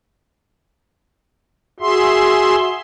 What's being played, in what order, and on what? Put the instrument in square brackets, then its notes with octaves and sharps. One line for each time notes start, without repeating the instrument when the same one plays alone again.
[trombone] F#4 [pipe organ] G#4 E5 C6